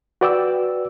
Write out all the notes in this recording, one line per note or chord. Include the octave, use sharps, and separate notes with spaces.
F#4 B4 D5 G5 D6 E6